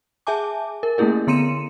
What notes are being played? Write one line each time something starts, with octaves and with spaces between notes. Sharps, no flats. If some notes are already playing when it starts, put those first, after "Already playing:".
G#4 E5 G#5 A5 D6
A#4
A3 A#3 C#4 E4 G#4 A#4
D3 B3 C6 C#7 D#7 E7